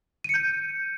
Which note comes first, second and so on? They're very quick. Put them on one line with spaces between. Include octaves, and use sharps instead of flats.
D#7 C#7 G6